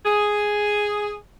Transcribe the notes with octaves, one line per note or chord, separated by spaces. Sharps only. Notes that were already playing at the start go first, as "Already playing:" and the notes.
G#4